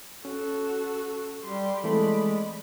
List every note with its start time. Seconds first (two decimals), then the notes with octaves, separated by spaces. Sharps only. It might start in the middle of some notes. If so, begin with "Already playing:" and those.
0.25 C#4 F#4 A4
1.45 G3 G4 C6
1.84 E3 G#3 A3 C4 D5 B5